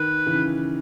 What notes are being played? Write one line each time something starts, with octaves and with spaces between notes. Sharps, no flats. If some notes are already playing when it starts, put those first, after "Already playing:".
Already playing: D#3 B4
C#3 E3